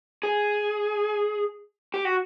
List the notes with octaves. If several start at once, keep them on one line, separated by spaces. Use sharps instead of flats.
G#4
G4
F#4